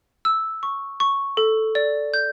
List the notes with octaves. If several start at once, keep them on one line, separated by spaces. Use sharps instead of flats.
E6
C#6
C#6
A4
D5
G6